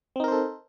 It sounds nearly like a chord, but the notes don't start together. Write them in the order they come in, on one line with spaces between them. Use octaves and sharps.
C4 D#4 A#4 C5 A4